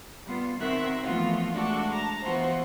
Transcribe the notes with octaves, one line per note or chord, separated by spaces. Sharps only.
G3 B3 F4
D#3 C4 F#4 A#4 E5 F#6
E3 F3 A3 B3 F4 F#4
G#3 A3 D4 F#4 A4
A5 A#5
E3 B3 F4 F#4 C5